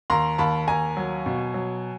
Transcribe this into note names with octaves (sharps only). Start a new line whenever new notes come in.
D#2 A#5 C6
D#2 A5 B5
D#2 G#5 A#5
F#3
B2
F#3